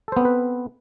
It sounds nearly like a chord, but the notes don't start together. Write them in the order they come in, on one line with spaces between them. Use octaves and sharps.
A4 C5 B3 C4 B4